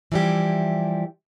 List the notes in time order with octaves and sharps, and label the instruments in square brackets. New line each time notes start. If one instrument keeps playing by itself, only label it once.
[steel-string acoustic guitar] E3 F3 G3 E4 G4